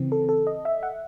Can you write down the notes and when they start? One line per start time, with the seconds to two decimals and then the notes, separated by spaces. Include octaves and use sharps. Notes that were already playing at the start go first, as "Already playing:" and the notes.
Already playing: C#3 E3 C4
0.12 A4
0.29 A4
0.47 D#5
0.65 E5
0.83 F#5